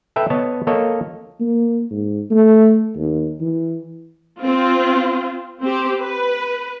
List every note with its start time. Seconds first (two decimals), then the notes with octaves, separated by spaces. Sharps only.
0.16 A4 B4 E5 G5
0.30 B3 C#5 D#5 A5
0.67 A#3 A4 C#5 D#5
1.40 A#3
1.91 G#2
2.31 A3
2.96 D#2
3.41 E3
4.40 C4 F4
5.62 C4 G4
6.00 B4